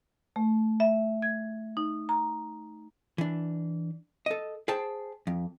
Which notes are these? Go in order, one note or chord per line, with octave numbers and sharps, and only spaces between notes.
A3
E5
G#6
D#4
A#5
E3 D4
A4 D#5
G#4 C5 G5 A5
F2